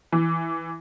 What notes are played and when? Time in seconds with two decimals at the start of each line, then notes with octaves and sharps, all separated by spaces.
0.12 E3